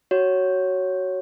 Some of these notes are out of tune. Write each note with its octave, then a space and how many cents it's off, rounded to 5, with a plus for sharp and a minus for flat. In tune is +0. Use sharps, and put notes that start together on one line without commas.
F#4 +15 C#5 +0